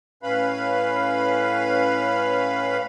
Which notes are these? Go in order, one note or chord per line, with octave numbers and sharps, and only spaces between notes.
A2 C#4 B4 F5 B5